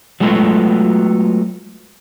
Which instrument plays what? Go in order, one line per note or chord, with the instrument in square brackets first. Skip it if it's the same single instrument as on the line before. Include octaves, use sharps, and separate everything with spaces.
[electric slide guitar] F#3 G#3 A3 B3 F4 F#4